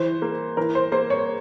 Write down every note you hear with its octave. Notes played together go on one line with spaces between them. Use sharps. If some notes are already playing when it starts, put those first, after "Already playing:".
Already playing: E3 C5
A#3
E3 A#4
C5
A#3 C5
C#5